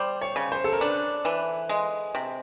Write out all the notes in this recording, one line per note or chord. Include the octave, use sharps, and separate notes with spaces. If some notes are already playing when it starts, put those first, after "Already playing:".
Already playing: G3 C5
C#5
C#3
C5
A4
A#4
D4 B4
E3
G#3
C3